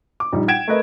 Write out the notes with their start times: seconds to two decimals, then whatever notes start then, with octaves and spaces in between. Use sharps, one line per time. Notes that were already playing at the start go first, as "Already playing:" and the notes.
0.20 D6
0.33 A#1 G3 D#4
0.48 F#5 G5 G#6 D7 E7
0.68 A3 A#4 B4 D#5